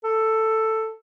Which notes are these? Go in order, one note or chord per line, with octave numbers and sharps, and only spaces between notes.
A4